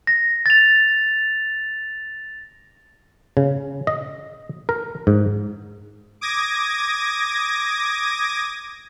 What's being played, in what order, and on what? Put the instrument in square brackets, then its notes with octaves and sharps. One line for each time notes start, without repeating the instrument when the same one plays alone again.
[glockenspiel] A#6
A6 F7
[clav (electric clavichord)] C#3
D#5
A#4
G#2
[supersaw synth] D6 D#6 G#6 A#6